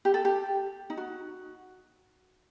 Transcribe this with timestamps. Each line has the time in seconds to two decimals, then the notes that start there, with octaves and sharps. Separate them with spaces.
0.05 G4
0.14 A4
0.25 G4
0.90 D#4
0.97 F#4